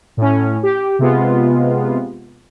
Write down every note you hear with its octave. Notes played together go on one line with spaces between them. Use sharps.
A2 C#4
G4
C3 G#3 B3 F4